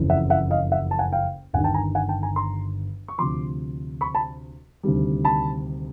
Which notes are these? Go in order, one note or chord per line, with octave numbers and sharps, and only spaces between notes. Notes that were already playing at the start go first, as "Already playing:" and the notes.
Already playing: F#1 F2 C#3 E3
E5 F#5
E5 F#5
D#5 F5
E5 F#5
A5
F#5 G#5
F5 G5
G1 G2 D#3 F#5 G#5
G5 A5
G#5 A#5
F#5 G#5
G5 A5
G#5 A#5
A#5 C6
C#6
D2 C3 F3 C6 D6
B5 C#6
A5 B5
D2 C3 D#3 G3
A5 B5